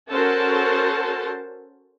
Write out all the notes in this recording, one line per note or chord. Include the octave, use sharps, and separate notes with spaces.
C#4 F#4 A4 A#4 C5 A5